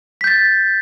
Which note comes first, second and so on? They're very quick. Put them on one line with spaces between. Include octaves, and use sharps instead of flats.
B6 G6 A6